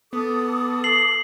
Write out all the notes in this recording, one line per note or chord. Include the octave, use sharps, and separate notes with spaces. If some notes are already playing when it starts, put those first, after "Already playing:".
B3 A4 D6 D#6
C7 F#7